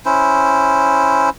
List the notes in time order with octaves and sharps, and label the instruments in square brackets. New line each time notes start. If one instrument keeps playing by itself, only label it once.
[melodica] C#4 E4 C5